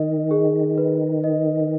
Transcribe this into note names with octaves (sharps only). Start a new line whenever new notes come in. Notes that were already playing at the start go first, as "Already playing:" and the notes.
Already playing: D#3 D#5
G#4
B4
D#5